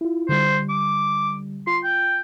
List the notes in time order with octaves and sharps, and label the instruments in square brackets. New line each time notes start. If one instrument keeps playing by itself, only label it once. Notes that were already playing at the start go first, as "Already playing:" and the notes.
[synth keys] E4 F4
[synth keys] D3 G3 [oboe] C5
[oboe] D6
[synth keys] F4 [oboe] C6
[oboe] G5